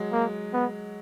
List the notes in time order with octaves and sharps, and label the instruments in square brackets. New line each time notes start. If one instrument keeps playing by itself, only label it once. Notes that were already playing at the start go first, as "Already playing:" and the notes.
Already playing: [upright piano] F#3 G#3
[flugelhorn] A#3
B3